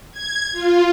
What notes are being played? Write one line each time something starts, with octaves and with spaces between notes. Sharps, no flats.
G#6
F4